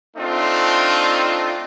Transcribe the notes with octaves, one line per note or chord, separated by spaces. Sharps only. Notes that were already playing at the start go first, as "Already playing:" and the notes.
A3 C4 D4 D#4 F4